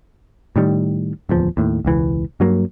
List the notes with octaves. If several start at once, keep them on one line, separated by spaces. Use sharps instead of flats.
A2 D#3 G3
D1 E2 F3
D#2 A2
E1 C#2 E3
G2 F#3 A#3